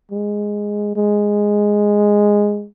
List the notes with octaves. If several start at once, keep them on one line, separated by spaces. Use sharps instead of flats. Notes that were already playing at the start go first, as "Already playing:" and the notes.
G#3
G#3